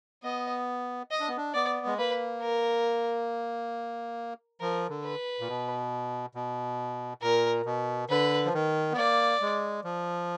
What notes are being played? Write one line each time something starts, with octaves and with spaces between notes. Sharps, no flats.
B3 D#5
D#5
D4
B3
D4
B3 D5
G#3
A#3 B4
A#4
F3 A#4
D3
B4
A#2
B2
B2
A#2 A#4
B2
D3 B4
F3
D#3
B3
A#3 D5
G#3
F3